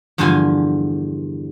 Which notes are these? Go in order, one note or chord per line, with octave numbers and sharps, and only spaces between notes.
E2 G2 D3 F3 F4 G#5